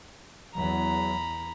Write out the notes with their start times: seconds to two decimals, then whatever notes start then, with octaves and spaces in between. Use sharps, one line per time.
0.55 E2 F#3 A#5 B5